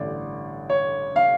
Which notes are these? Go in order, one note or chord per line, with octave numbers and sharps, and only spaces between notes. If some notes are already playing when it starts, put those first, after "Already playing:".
Already playing: A1 G2 D3 D5
C#5
F5